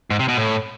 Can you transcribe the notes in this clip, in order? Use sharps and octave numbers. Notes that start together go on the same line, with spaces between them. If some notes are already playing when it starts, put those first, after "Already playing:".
G#2
C3
B2
A2